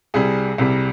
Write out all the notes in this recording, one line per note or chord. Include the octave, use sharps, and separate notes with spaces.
C2 C3 G3 G#4
C2 C3 G3